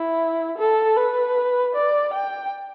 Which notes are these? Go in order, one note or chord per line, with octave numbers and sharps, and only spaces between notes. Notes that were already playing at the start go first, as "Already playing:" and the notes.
Already playing: E4
A4
B4
D5
G5